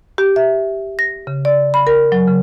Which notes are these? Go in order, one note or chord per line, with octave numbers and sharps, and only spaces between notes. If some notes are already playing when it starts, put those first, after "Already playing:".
G4
E5
A#6
C#3
D5
B5
A#4
F#3
C#3